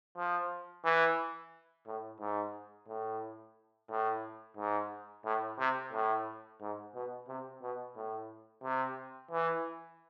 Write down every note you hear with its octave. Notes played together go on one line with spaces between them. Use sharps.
F3
E3
A2
G#2
A2
A2
G#2
A2
C3
A2
G#2
B2
C3
B2
A2
C3
E3